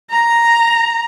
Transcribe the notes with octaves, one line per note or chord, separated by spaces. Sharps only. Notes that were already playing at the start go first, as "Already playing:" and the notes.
A#5